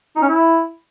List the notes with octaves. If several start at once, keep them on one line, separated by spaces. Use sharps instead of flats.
D#4
C#4
E4